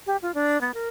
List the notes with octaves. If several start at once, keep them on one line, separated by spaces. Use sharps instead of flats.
G4
F4
D4
B3
A#4